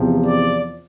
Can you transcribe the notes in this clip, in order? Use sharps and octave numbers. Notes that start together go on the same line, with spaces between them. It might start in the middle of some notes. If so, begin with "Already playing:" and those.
Already playing: E2 C3 F3
D5